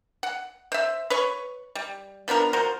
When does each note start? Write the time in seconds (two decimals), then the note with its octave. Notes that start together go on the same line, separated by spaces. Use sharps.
0.23 F#5
0.72 C5 E5
1.10 B4 C#5 C#6
1.75 G3
2.28 F3 B3 D4 A#4
2.53 F3 F#4 A#4 C5